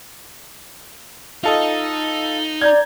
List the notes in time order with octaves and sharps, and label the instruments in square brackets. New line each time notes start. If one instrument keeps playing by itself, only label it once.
[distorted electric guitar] D#4 [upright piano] F4 A4 D#5
[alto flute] D5 [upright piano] A#5 G6 G#6